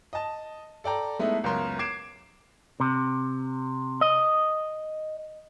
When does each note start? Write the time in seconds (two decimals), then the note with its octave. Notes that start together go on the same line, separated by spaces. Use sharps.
0.13 D#5 A5
0.84 A4 D5 G5 A#5
1.19 G#3 A3 B3 D#4 E4
1.44 C#2 F#2 B3 A#4 C#5 C6
1.79 D6 G#6 C7 D7 E7
2.80 C3
4.01 D#5